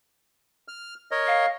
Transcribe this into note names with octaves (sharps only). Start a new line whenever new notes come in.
F6
A#4 C#5 D#5
F5